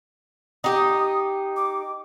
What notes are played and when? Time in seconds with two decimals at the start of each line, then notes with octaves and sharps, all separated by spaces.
0.64 D#4 G4 D#6
1.56 D6